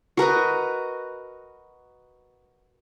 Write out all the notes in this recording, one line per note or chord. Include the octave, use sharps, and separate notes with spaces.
F#4 A#4 B4 D#5